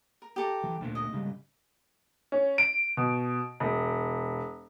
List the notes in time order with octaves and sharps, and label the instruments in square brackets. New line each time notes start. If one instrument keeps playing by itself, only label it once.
[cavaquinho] A#4
G4 A4 A#5
[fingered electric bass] E3
D2 A#2
[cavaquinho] D#5
[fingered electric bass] G#2 C#3 G3
[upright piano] C#4
D7
B2
E1